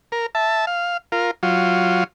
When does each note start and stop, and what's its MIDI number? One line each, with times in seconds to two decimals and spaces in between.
0.12 0.26 70
0.35 0.65 76
0.35 0.65 81
0.67 0.97 77
1.12 1.31 65
1.12 1.31 70
1.43 2.04 54
1.43 2.04 65